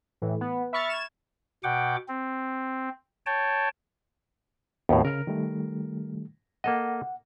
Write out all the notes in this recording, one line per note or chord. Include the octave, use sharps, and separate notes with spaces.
A2 E3
B3
E5 B5 C#6 F6 A6
G#6 E7
B2 F#5 G5 D6
C4
C#5 G5 A5
D#2 A2 B3 D4 F#4
C#3 A#4 F6
D#3 G3 A3
A#3 A4 D#5 F#5